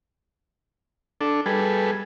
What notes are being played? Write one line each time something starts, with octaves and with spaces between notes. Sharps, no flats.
D4 A4
G3 G#4 A4 B4